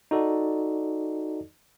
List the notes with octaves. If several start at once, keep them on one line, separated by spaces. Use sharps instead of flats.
D#4 F#4 A4 D5